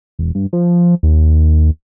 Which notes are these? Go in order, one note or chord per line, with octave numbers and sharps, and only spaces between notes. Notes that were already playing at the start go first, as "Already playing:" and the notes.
E1
G2
F3
D#2